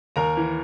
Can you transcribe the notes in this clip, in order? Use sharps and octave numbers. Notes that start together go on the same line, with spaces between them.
D#2 A#4 A#5
E3